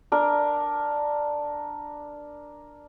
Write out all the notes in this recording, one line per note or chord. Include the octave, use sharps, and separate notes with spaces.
D4 A#4